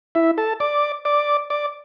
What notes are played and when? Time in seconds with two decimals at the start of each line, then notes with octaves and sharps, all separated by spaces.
0.15 E4 E5
0.38 A4 A5
0.60 D5 D6
1.05 D5 D6
1.50 D5 D6